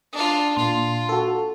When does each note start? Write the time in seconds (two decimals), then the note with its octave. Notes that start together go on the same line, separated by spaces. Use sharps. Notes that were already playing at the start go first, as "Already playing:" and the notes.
0.13 D4 F4 D#6
0.56 A#2 F4 C6
1.09 F#4 A4